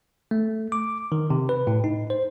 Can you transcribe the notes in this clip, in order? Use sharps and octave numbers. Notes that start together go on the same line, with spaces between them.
A3
D6
D#3
C3
B4
A2
D#4
C5